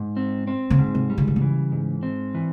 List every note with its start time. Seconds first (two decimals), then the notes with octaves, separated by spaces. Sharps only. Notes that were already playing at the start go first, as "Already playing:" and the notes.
Already playing: G#2
0.17 C4
0.47 C4
0.70 C#3
0.79 G#2
0.95 C3
1.10 G3
1.18 C#3
1.28 D3
1.36 C#3
1.41 E3
1.72 G#2
2.03 C4
2.35 E3